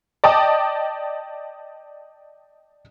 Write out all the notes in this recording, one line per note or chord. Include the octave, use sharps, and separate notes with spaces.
D5 D#5 G5 A5 D6 D#6